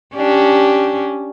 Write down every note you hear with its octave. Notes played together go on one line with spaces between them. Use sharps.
C#4 D4 G4